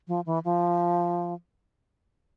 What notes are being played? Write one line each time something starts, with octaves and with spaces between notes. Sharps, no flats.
F3
E3
F3